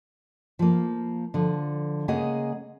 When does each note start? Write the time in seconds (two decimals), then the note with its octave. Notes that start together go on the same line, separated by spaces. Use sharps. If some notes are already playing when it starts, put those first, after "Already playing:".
0.59 F3 A#3
1.34 D3 F3
2.08 C#3 G#3 A#3 G#4 D#5 F#5